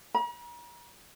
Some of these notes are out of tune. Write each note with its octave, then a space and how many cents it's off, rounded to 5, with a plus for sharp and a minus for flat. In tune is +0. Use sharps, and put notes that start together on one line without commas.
A#5 +45